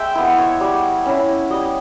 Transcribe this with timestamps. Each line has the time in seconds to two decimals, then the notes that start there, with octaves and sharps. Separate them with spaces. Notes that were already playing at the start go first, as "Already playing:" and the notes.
Already playing: G#3 C#5 E5 G5
0.15 B3 E4
0.38 C#5
0.60 G3
1.06 C#4 E4
1.50 G3 D#5